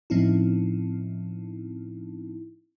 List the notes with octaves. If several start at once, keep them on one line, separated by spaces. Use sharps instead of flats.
A2 F3 C4 C#4 D#4 E4